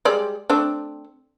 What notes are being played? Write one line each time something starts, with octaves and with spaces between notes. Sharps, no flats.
G3 G#3 D5
A3 C4 D4